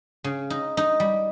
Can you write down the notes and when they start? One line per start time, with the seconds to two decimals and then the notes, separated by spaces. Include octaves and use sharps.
0.24 C#3
0.50 D#4
0.77 D#4
1.00 G3